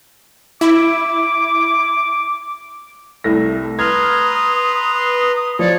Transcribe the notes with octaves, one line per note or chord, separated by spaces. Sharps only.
E4 D6
C2 A3 A#6
B4 A#5 C6 D#6 F6 G#6
F3 C#5 D5